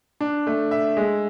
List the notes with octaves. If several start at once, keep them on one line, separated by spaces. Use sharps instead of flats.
D4
A3
E5
G#3